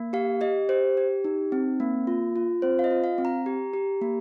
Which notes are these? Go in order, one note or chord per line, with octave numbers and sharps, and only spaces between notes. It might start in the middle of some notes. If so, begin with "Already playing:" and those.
Already playing: A#3
G4 F5
G4 D#5
G4 C5
G4
D#4
C4
A#3
F4
F4
C4 C5
F5
D#5
F4
F5
C4
A#5
G4
G4
A#3